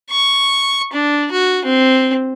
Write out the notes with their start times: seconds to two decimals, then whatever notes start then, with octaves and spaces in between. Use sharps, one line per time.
0.11 C#6
0.93 D4
1.32 F#4
1.65 C4